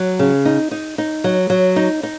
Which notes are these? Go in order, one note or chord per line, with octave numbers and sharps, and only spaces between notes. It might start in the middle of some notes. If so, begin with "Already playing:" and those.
Already playing: F#3
C#3
D#4
D#4
D#4
F#3
F#3
D#4
D#4